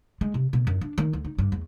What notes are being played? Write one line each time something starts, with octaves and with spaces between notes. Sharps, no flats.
G#3
C3
B2
F#2
D4
D#3
D2
D#4
G2
E2